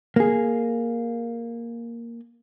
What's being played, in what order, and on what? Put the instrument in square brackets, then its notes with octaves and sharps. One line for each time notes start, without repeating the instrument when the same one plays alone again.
[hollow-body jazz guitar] A#3 G#4